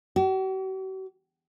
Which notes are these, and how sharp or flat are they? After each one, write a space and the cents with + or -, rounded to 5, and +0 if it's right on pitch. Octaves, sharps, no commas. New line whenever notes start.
F#4 +45